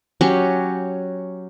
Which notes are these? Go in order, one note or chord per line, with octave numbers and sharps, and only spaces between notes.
F#3 C#4 G4